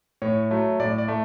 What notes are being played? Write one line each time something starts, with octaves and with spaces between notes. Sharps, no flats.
A2 C#5
F#3 A3
A2 D5
D5
A3